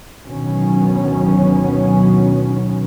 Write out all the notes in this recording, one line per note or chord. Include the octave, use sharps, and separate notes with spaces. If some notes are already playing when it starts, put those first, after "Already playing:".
D2 B2 D#3 F#3 B3 C#4